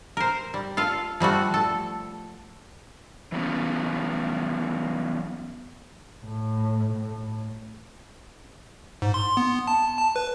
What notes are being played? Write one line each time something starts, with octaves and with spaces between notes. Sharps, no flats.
A#4 C5
G3
F4 A4 F5
F3 G3 A3 F#4
A4
E3 F#3 B3 C#4
A2
A2
G#2
C6
B3
A5
A5
B4